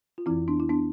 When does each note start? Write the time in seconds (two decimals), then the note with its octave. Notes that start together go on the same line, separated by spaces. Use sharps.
0.18 F4
0.26 E3 C4 E4
0.30 F2
0.48 B3 D4
0.60 E4
0.69 B3 D4